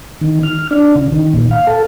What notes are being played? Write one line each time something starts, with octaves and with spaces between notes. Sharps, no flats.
D#3
F6
D4
C#3
D#3
A#2
F5
A4